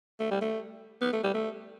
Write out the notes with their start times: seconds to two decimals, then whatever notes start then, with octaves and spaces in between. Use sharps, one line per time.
0.20 A3
0.31 G3
0.41 A3
1.01 B3
1.13 A3
1.24 G3
1.34 A3